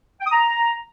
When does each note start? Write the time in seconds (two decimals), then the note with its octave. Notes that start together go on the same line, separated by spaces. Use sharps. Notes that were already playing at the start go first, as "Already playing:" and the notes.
0.19 G5
0.25 D#6
0.31 A#5